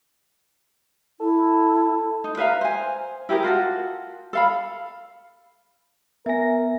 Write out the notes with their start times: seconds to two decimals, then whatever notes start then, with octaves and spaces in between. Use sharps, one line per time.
1.20 E4 A4
2.24 D#4
2.37 B4 E5 F5 A#5
2.61 C5 G#5
3.29 E4 G4 G#4 A#4
3.43 F4 F#4 A4 F#5
4.33 A4 F5 B5
6.26 B3 A#4 E5 G#5 A#6